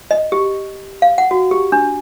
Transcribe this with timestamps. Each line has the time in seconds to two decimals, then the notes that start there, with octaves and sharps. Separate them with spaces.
0.11 D#5
0.32 G4
1.02 F5
1.18 F#5
1.31 F#4
1.51 G4
1.72 D4